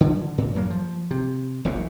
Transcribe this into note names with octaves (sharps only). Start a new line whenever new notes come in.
D3
A2
F#2 F#3 A#3
F3
C3
E1 A#1 D#2 A#2